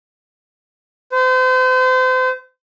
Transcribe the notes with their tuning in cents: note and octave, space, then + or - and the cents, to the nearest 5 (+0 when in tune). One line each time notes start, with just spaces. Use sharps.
C5 -35